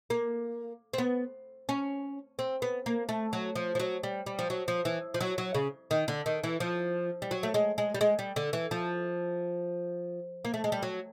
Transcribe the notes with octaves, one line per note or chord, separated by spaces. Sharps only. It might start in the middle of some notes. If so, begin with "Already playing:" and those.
A#3
C4
B3
C#4
C4
B3
A#3
A3
F#3
F3
F3
F#3
G3
G3
F3
F#3
F3
E3
F3
F#3
F#3
C#3
D#3
D3
D#3
E3
F3
G3
F#3
A3
G#3
G#3
G3
G#3
G3
D3
E3
F3
A#3
A3
G#3
G3
F#3